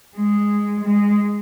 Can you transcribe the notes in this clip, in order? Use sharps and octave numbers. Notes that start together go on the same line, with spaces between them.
G#3
G#3